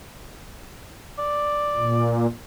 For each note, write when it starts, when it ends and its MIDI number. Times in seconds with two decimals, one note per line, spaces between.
1.19 2.23 74
1.76 2.26 46